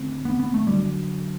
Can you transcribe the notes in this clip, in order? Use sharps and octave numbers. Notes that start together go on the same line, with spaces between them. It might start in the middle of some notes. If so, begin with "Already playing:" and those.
Already playing: D3 A3 C4
B3
B3
A3
D3 F#3 G3